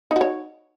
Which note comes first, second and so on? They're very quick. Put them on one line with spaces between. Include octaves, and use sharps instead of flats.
D#4 F#4 C#5